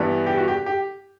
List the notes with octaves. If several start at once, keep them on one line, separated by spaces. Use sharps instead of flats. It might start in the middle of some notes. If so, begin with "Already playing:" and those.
Already playing: G2 E3 G3 B3 D4
G4
F#4
G4
G4